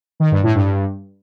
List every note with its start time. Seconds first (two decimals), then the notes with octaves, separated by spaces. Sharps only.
0.20 D#3
0.32 G2
0.43 A2
0.55 G2